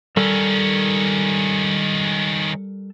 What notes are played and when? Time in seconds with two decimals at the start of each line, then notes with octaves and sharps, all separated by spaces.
0.17 D#3 G3 C#4 A4 A#4